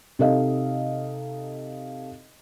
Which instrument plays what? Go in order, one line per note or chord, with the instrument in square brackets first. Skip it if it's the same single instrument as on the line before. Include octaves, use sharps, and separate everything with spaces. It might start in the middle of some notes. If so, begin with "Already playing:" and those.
[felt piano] C3 D#4 A4 D#5 F5